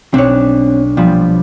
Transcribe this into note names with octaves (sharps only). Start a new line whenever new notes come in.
B1 C4 D4 C#5 F#6
A#2 F3 G3 B3